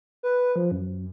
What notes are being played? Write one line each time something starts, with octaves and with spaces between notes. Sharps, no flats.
B4
F3
F#2